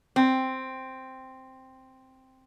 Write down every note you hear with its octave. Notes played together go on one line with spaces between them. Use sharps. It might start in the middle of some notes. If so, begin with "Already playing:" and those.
C4